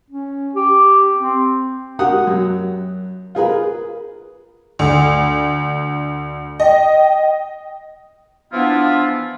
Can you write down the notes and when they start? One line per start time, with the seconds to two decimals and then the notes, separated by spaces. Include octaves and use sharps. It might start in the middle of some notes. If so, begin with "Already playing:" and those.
0.10 C#4
0.54 G4
1.17 C4
1.99 F#4 G4 A#4 F#5 D#6
2.27 F#2
3.35 F4 G#4 A#4 B4
4.79 D2
6.60 D#5 G5
8.53 E3 F3 B3 D4 E4 F4